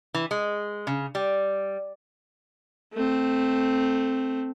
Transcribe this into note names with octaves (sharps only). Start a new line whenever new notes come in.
E3
G#3
C#3
G3
A3 C4